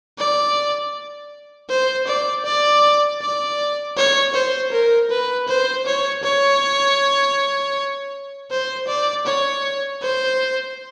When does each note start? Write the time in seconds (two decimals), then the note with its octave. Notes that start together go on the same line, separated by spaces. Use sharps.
0.18 D5
1.70 C5
2.07 D5
2.45 D5
3.22 D5
3.97 C#5
4.34 C5
4.72 A#4
5.10 B4
5.48 C5
5.86 C#5
6.23 C#5
8.51 C5
8.88 D5
9.26 C#5
10.02 C5